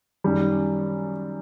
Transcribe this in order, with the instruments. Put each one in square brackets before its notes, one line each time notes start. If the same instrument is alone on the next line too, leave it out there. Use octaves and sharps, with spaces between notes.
[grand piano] F#2 D#3 G3